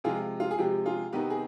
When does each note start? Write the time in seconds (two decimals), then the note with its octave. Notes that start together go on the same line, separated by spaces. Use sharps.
0.04 C3 F3 G#3 F4 G#4
0.40 F4
0.51 G#4
0.58 C3 F3 G#3 G4
0.85 F4 G#4
1.12 C3 D#3 B3 D#4 G4 B4
1.30 G#4